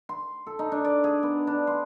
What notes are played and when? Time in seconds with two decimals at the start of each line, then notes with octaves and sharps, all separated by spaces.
0.09 C6
0.46 A4
0.59 D#4
0.72 D4
0.85 D5
1.04 G#4
1.23 B3
1.47 D4
1.67 C6